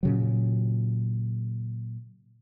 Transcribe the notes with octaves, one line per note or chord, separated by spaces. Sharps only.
A#2 C#3 F#3